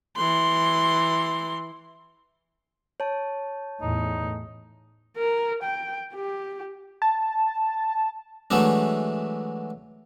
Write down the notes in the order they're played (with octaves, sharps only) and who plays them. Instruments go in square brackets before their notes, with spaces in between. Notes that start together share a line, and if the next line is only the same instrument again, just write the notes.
[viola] E3 C6
[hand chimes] C#5 A5
[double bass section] E2 A2 [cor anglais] D#4
[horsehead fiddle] A#4
G5
G4
[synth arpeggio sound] A5
[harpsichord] E3 F#3 G#3 A3 D4